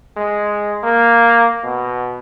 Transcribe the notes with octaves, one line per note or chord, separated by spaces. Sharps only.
G#3
A#3
B2